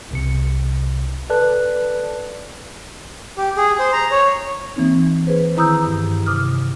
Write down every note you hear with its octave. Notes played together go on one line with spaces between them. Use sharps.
C2 C3 C#7
A4 B4 D5 A5 F#6
G4
G#4
C5
A#5
C#5
E3 A#3 C4 D#4
G#4 B4 C5
D#3 E4 A#5 D#6 E6 G6
G2
C3 D6 D#6 F6